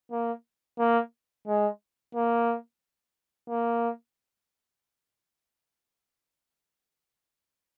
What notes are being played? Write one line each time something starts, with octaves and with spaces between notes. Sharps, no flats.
A#3
A#3
G#3
A#3
A#3